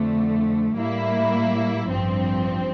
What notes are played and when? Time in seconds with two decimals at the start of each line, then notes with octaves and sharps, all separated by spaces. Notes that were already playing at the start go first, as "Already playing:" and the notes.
Already playing: F2 D3 A3
0.75 A2 G3 A#3 E4
1.90 A1 G2 F3 C4